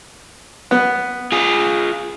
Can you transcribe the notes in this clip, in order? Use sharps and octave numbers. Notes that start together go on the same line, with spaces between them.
B3
F4 G#4